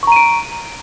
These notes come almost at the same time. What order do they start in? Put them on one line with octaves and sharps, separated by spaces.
C#6 A#5 D#7 D7